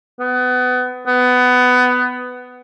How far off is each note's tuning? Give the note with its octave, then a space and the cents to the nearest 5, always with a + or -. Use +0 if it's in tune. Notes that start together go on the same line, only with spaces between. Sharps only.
B3 +25
B3 +15